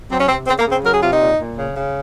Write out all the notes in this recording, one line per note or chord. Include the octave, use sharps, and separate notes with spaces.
F#3 C4
C#4
C3 C4
C#3 C4
A#3
C#3
C4
F#3 A#4
G#4
C3 F4
D#4
A#2
A#2
C#3
C#3